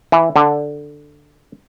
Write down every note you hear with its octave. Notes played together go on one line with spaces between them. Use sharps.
E3
D3